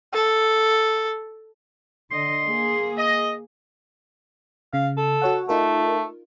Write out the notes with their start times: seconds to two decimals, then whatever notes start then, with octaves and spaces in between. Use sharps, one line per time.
0.13 A4
2.11 D3 D#5 C6
2.46 A#3 G#4
2.97 D#5
4.73 C#3 F5
4.97 A4
5.22 F#4 C#5 F#5
5.49 A3 D#4 F4 A#4